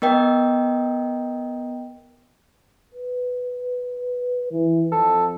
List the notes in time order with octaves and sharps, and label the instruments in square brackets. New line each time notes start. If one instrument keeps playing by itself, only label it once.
[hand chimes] B3 A#4 D#5 G5
[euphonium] B4
E3
[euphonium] F2 [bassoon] A4